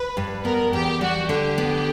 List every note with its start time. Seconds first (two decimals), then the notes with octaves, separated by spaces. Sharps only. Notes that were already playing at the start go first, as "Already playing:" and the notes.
Already playing: B4
0.17 G2
0.44 B3 A#4
0.73 E2 G4
1.01 G3 F#4
1.29 D3 G4
1.58 B3